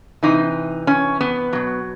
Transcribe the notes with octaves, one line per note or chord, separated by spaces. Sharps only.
C3 E3 D#4
C#4
B3
B2 F#3